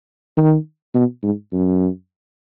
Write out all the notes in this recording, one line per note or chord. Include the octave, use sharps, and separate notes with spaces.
D#3
B2
G#2
F#2